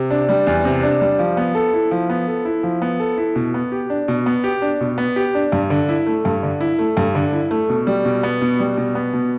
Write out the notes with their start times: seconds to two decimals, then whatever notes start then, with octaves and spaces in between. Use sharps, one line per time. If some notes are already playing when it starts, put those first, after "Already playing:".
Already playing: C3
0.11 D4
0.29 G3
0.47 E2
0.65 C3
0.83 D4
1.01 G3
1.19 F3
1.37 B3
1.55 A4
1.74 E4
1.91 F3
2.09 B3
2.28 A4
2.45 E4
2.63 F3
2.82 B3
3.00 A4
3.18 E4
3.35 B2
3.54 B3
3.72 G4
3.90 D4
4.08 B2
4.26 B3
4.44 G4
4.62 D4
4.81 B2
4.98 B3
5.16 G4
5.35 D4
5.52 G2
5.70 D3
5.89 E4
6.07 A3
6.25 G2
6.43 D3
6.61 E4
6.79 A3
6.97 G2
7.15 D3
7.33 E4
7.51 A3
7.69 B2
7.87 G3
8.05 B2
8.23 B3
8.41 B2
8.60 G3
8.77 B2
8.95 B3
9.13 B2